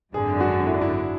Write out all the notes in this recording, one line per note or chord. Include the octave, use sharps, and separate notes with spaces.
G#1 F#2 D3 G#4
F#4
E4
D4
E4